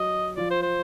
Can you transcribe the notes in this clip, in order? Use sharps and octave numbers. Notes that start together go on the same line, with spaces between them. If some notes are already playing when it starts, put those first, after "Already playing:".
Already playing: F#3 F#4 D#5
F3 F4 D5
C5
C5